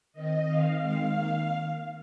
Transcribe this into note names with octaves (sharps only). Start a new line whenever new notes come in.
D#3 C4 D#5
D#3 C4 F5
D#3 G#3 C4
D#3 A#3